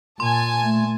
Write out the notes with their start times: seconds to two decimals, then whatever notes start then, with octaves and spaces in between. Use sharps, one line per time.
0.20 A#2 G#5 A5 C6
0.63 A3